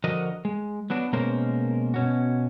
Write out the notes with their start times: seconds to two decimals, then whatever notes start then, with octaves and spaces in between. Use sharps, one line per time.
0.04 D3 F3 F#4 A#4 D#5
0.45 G#3
0.90 F#3 B3 D4 F#4
1.13 B2 G#3 A#3 C#4 A#4 C5
1.94 B2 C#4 F#4